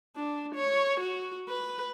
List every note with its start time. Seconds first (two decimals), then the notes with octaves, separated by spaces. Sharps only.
0.17 D4
0.55 C#5
1.00 F#4
1.49 B4